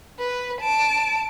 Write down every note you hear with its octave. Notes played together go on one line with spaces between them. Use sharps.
B4
A5 D7